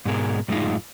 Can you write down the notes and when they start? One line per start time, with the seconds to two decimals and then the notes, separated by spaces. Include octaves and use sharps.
0.05 G#2 B2 G#3 A#4
0.48 F#2 A2 G#3 A#3 D#4 F4